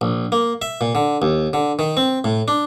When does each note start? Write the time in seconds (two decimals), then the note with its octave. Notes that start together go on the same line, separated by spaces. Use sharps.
0.01 A#1
0.32 A#3
0.62 E5
0.81 A#2
0.95 D3
1.22 D#2
1.53 D3
1.79 D#3
1.97 C4
2.24 A2
2.48 D4